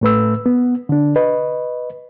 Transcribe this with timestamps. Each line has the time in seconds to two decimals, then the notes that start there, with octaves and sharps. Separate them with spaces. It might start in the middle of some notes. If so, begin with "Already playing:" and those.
0.01 A2 A3 B4 E6
0.46 B3
0.89 D3 D4
1.16 B4 D#5